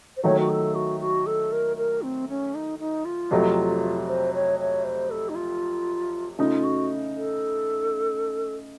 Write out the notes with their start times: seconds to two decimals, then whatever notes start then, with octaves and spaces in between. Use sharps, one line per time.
0.17 C5
0.24 D#3 F#3 A3 C#5
0.39 F#4
0.49 A4
0.75 F#4
1.00 F#4
1.26 A4
1.52 A#4
1.77 A#4
2.02 C4
2.29 C#4
2.55 D#4
2.79 D#4
3.05 F4
3.31 F2 C3 F#3 A3
4.08 C5
4.34 C#5
4.59 C#5
4.84 C5
5.11 A4
5.29 D#4
5.35 F4
6.38 C#3 A3 D#4 F4
6.64 F#4
7.16 A4